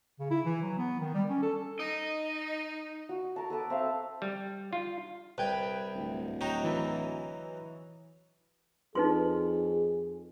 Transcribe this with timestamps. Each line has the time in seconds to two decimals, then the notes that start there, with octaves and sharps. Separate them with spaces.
0.19 C#3
0.31 E4
0.45 E3
0.62 F#3
0.78 B3
1.00 D#3
1.14 G3
1.29 C#4
1.42 A4
1.80 D#4 D#5
3.09 F#4
3.36 A#4 A5
3.50 A4 B4 A5 D6
3.70 C4 E5 F5
4.22 G3
4.73 F4
5.38 C2 B4 G5 G#6
5.95 D1
6.41 F#3 D#4 G5
6.64 E3
8.95 F2 D#4 G#4 B4 C6